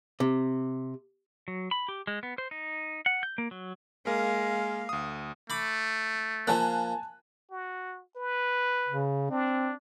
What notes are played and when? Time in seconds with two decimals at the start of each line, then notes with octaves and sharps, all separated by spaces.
0.20 C3
1.48 F#3
1.71 B5
1.88 G4
2.07 G#3
2.23 B3
2.38 C5
2.51 D#4
3.06 F#5
3.23 G6
3.38 A#3
3.51 F#3
4.07 G#3 A#3 A#4 F5
4.89 D2 D#6
5.50 A3 B5 D6
6.47 F3 A#3 G#5 A5 F#6
7.51 F#4
8.16 B4
8.88 C#3
9.31 C4 D4